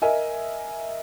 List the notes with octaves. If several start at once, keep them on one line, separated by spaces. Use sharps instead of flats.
A#4 D#5 E5 G#5